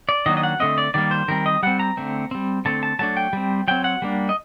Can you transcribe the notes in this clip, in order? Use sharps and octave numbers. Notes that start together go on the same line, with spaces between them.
D5
D#3 F#3 A#3 D4 D#5
D#5
F#5
D3 A3 C4 D#5
D5
D#3 G3 A#3 D5
C5
D#3 G3 C4 A#4
D#5
G3 C4 F#5
A#5
D3 A3 C4
G3 C4
D3 A3 C4 A5
A5
F#3 A3 D4 A5
G5
G3 C4
F#3 C4 G5
F#5
G3 A#3 D4
D#5